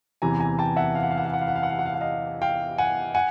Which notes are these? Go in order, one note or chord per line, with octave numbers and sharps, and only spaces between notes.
E2 C3 E3 G#5 A#5
G#5 A#5
G5 A5
E5 F#5
F5
F#5
F5
F#5
F5
F#5
F5
F#5
F5
F#5
F5
F#5
F5
F#5
D#5 F5
F5 G5
F#5 G#5
F#5 G#5